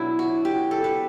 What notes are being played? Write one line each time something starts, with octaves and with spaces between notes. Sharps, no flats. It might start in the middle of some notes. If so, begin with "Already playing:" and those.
Already playing: B2 F#3 D4 E4
F#4
G4
A4
B4